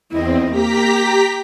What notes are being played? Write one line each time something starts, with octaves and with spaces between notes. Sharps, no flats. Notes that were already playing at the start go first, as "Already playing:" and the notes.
E2 C4 E4 D#5
A#3 G4 A#5 B6